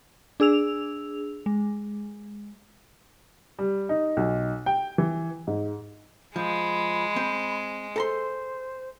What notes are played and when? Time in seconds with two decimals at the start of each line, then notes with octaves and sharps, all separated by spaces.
0.40 D4 G#4 E6 F7
1.46 G#3
3.59 G3
3.89 D#4
4.17 B1
4.66 G5
4.98 E3
5.47 G#2
6.36 F3 G#3 B5
7.16 C4
7.96 A4 C5 A#5 C6